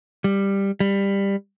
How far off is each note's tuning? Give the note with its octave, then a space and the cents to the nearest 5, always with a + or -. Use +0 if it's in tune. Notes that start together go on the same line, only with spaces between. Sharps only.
G3 +10
G3 +15